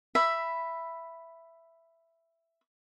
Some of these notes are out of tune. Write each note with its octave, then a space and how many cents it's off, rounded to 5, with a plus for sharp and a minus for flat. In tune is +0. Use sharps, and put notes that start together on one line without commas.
E5 +10 B5 +0